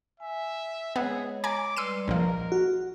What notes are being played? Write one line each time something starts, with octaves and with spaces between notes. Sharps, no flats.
E5 G#5
G#3 B3 G#4 C#5 D#5
G#5 A#5 D6
G3 B4 D5 C6 E6 C#7 D#7
A#1 F3 A#4 D#5
F#4